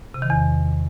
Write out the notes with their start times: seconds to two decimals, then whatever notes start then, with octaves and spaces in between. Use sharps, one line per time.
0.14 C3
0.22 D#3
0.30 E2